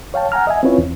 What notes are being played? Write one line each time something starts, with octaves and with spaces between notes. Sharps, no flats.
C#5 F5 G5 A5
F#5 G#5 A#5 F6
D#5 E5 G#5
C4 C#4 E4 F4 B4 C#5
E2